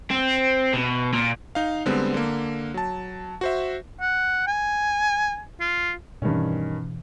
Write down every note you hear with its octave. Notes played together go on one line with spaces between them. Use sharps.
C4
B2
A#2
D#4 F5
D3 G3 G#3 B3 C4
D3 A#3
F#3 A5
F#4 C5 E5
F#5
G#5
F4
G2 B2 D#3 E3 C#4